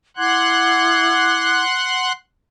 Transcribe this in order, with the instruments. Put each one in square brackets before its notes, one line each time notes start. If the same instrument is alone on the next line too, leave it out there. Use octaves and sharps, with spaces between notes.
[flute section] E4 D6 G#6 [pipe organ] F#5 C6 F#6